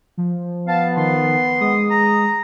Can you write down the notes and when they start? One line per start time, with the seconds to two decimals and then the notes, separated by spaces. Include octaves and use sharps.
0.17 F3
0.68 B3 F5 A5
0.97 D#3 C6
1.60 G#3 D#6
1.90 A#5